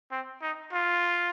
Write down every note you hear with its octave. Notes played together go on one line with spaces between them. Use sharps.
C4
D#4
F4